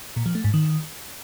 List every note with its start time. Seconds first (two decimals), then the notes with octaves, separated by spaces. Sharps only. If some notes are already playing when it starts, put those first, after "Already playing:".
0.16 A#2
0.26 F3
0.35 A3
0.44 G#2
0.54 D#3